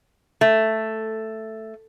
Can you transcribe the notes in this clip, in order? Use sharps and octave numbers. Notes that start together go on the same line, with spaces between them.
A3